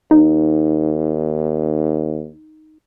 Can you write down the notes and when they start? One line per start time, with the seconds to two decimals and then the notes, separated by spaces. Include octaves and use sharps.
0.11 D#2 D#4